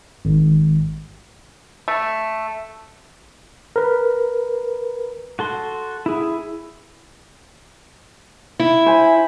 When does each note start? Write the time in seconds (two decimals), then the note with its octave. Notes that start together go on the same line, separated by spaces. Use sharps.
0.25 G#1
1.88 A3
3.76 A#4 B4
5.39 F#4 A4 C6
6.06 E4 G#4
8.59 E4
8.86 C5 G#5 B5